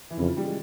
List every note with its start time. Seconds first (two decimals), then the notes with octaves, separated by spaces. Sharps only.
0.10 E3
0.19 F2 C#3
0.28 F3
0.37 G3
0.45 G#3